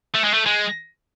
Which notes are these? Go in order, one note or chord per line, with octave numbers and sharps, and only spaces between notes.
A3
G#3
A3
G#3